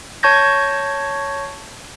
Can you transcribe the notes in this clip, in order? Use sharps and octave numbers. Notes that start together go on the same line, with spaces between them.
C#5 A5 C#6 G6 G#6 A#6